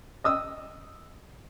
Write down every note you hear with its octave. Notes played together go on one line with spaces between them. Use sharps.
D#5 D#6 E6